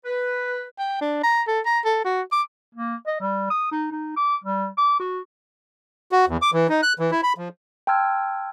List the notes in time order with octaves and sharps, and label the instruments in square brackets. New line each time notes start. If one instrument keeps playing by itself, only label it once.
[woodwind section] B4
[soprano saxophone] G5
D4
A#5
A4
A#5
A4
F#4
D6
[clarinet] A#3
D#5
G3
D#6
D#4
D#4
D6
G3
D6
F#4
[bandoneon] F#4
E2
D6
E3
D#4
F#6
E3
E4
B5
F3
[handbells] G5 A5 C6 E6 F6 G#6